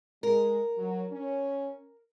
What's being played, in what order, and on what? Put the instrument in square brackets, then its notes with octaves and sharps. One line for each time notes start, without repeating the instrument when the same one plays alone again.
[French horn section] G#3 [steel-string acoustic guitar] A#4
[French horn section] F#3
C#4